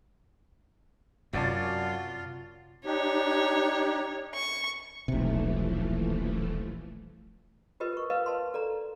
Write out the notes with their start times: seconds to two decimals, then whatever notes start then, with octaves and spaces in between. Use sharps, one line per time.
1.33 F#2 C3 F#3 F4 D5 A5
2.85 D4 D#4 G4 C#5
4.35 C#6
5.08 D#1 B1 C3 E3 F3 A3
7.80 F4 G4 A#4 B4 D#5
7.93 A#4 C#6
8.10 A#4 B4 D#5 F5
8.26 B4 A5 C6
8.54 A4 D5 A#5